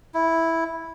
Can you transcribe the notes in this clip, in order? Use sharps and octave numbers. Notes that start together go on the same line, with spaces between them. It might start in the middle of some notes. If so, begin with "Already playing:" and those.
E4